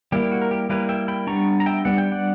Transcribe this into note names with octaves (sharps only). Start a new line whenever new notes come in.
G3 A#3 E4 G4
F#4
A#4
G4
G3 A#3 E4 G4 B4
E5 G5
G5 B5
G3 B3 D4 A#5 C#6
A#5
E5 G5
G3 B3 D4 F#5
G5
D5 F#5